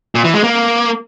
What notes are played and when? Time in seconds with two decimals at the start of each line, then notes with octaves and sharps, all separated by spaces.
0.15 A#2
0.24 E3
0.34 G#3
0.44 A#3